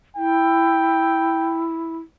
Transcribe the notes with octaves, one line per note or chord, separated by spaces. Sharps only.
E4 G5